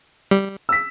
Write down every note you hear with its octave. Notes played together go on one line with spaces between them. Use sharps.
G3
E6 B6